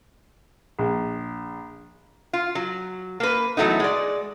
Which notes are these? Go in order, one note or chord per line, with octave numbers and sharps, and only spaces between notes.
A#1
F4
F#3
A#3 B4
E3 F#3 A3 B3 D#4
G#3 D5